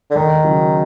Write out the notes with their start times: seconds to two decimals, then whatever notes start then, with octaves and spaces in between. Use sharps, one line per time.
0.10 D3
0.15 D#2 D#3
0.44 C#3 F#3